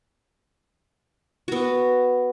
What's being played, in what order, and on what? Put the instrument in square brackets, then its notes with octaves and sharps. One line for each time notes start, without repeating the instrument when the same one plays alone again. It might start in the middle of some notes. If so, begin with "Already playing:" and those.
[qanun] B3 F#4